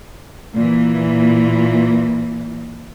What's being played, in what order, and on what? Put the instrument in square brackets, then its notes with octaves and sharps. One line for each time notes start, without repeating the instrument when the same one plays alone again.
[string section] A#2 E3